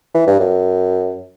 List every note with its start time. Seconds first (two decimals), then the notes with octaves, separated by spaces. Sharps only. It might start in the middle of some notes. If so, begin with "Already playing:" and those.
0.14 E3
0.27 G2
0.40 F#2